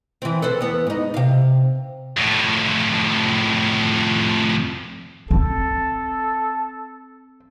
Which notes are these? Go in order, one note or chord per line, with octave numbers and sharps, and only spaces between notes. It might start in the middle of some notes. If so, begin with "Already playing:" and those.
E3 C4
A4 B4 C5
E2 B3
G#2 D#4
C3 F5
F2 A2
C4 A4